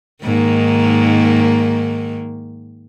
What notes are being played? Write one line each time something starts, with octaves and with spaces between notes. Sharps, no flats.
G#2 D#3 A#3